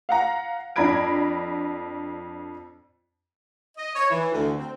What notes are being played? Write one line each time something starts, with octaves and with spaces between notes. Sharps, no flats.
F5 F#5 A#5
F2 D4 A#5 B5 G#6 D7
D#5
C#5
E3
D2
C4